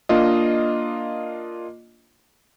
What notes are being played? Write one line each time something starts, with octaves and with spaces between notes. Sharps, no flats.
A#3 D4 F4 D#5